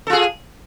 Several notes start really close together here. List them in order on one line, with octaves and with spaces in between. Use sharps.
A4 F4 G#4